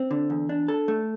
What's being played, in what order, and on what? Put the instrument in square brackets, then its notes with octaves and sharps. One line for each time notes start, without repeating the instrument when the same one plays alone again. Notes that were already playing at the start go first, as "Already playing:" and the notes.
Already playing: [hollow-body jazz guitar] C4
D3
E2
D4
A4
A3